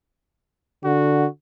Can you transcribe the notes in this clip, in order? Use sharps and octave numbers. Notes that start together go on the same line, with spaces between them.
D3 F#4